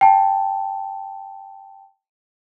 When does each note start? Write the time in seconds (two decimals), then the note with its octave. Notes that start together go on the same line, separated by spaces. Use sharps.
0.01 G5 A5